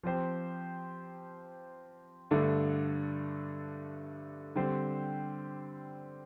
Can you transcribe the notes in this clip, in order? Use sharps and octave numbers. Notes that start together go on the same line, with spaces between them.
F3 C4 G4 C5
G2 D3 A3 D4
D3 G3 C4 G4 C5